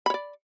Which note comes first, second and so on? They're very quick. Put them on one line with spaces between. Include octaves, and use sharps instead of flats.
B5 C#5 D5